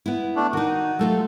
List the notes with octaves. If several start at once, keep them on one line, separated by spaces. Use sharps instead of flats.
B3 E4
A3 D4
D#3 D#4 F#4
F#3 A3 F4 A4